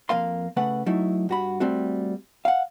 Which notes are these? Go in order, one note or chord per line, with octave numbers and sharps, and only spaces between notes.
F2 A#3 F5 C6
C#3 A3 B4 F#5
F#3 A3 D#4 E4
G2 F#4 B5
G3 A3 C4 F#4
F5 F#5